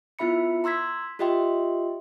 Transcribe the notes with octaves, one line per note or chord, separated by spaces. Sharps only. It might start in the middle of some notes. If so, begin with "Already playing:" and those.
B3 E4 F4 E5 B5 C#7
A#5 C6 E6 G#6 B6
F4 G4 D#5 E5 G5 C6